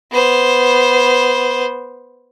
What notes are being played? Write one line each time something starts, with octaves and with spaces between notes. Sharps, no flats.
B3 C5